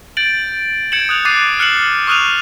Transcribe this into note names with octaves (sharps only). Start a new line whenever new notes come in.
G6 A6 D7 F#7
G6 G#6 C#7 D7 E7 F#7
D#6 F#6 F7
D6 F#6 A6 C7 D#7
F6 F#6 C#7 E7 F#7
C#6 D#6 F6 F#6 D#7 F7